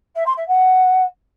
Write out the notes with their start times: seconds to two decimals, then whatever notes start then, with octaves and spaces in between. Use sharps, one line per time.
0.15 E5
0.26 C6
0.37 E5
0.48 F#5